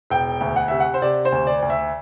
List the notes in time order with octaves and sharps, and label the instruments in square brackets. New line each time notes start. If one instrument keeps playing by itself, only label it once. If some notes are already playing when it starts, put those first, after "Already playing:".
[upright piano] E1 G5
D2
F#5
C3 E5
F#5
C5
C3 D5
C5
D2
D5
D2
E5